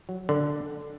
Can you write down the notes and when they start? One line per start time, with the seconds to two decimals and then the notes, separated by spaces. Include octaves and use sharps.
0.09 F#3
0.29 D3